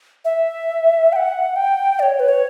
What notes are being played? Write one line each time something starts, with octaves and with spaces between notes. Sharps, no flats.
E5
G5
F#5
G5
D5
C#5
B4
C#5